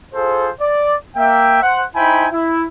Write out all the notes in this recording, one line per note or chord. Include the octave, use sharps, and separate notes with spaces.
F4 G#4 A4 C5
D5
A#3 E5 G5
C5 F#5
D#4 E4 C5 G5 G#5 B5
E4